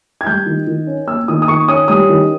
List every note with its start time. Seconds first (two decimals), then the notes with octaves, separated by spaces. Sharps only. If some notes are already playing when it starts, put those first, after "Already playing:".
0.21 G#6
0.27 G3 G6
0.46 D#3
0.67 D#3
0.87 C#4
1.07 A#3 E6
1.28 D#3 D#6
1.42 D#6
1.48 D#3 C#6
1.68 C#4 D#6
1.88 G3 D#6
2.09 D#3